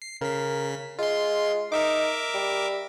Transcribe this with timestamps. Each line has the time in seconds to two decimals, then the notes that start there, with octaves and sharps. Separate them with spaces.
0.02 C7
0.21 C#3 A#4 B6
0.99 G#3 F4 C6
1.72 D#4 A#4 E5 D6
2.34 G3